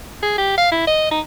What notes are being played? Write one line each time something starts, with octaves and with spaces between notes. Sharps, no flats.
G#4
G4
F5
E4
D#5
D#4